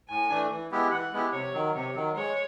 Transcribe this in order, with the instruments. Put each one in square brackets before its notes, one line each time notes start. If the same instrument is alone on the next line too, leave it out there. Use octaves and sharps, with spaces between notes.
[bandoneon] A2 [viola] G#5
[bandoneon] E3 A3 D4
E3
G#3 B3 E4 G4
[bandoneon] E3 [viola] F#5
[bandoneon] G#3 B3 E4 G4
[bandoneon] C3 [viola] C#5
[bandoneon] D#3 F#3
[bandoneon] C3 [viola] C#5
[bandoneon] D#3 F#3
[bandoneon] G#3 [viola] C#5